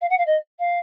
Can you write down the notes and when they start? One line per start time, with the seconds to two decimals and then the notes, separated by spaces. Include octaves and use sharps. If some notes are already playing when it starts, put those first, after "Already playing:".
0.01 F5
0.09 F#5
0.18 F5
0.26 D#5
0.59 F5